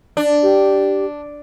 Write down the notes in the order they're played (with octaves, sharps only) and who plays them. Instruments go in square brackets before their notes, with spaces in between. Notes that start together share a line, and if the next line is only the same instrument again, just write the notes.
[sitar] D4
[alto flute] G4